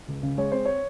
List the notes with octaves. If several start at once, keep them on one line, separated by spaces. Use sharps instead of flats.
C#2
C#3
G#3 C#5
C4 C5
C#5